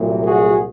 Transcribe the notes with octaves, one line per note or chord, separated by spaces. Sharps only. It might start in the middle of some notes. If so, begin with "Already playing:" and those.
Already playing: C2 A#2 F#3 A3
F#4 G#4